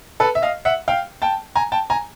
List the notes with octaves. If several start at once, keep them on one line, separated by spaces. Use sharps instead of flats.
A4 B4
E5
D#5 F5
E5 F#5
F5 G5
G5 A5
G#5 A#5
G5 A5
G#5 A#5